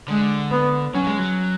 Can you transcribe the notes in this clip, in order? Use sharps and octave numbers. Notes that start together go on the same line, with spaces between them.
D3 G#3
B3
F#3 C#4
G#3
F#3